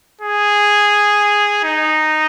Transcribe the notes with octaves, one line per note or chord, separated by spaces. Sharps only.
G#4
D#4